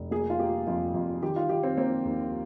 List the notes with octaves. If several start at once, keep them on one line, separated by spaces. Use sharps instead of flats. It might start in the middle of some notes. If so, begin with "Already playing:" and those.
Already playing: F1
A#3 G#4
F4
A#3 G4
F2 F4
F2
D#3 G4
F4
D#3 G4
C4
A#3 C4
D#2